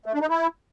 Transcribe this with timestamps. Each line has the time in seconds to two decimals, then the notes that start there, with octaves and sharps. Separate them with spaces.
0.06 A3
0.14 D4
0.22 D#4
0.29 E4